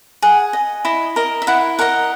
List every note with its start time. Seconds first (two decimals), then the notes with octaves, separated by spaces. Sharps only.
0.22 G#4 F#5
0.53 D#5
0.85 E4 D#5
1.16 A#4 D#5
1.42 E5
1.47 E4 F#5
1.79 A#4 D#5 F#5